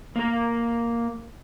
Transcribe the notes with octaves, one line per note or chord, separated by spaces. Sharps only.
A#3 A#4